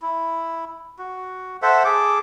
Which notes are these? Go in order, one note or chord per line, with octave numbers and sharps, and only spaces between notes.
E4
F#4
A4 C5 E5 F#5
G#4 A4 D6